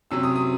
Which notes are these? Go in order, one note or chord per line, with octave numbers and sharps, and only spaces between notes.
C3 F#3 C#4 E6
D#6
D#6